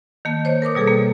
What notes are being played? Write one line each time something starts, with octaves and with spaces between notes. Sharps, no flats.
D#3 A#3 A5
C5 C#5 D#5
A#4 B4 D6 D#6
B2 G3 G#4 A4
A#3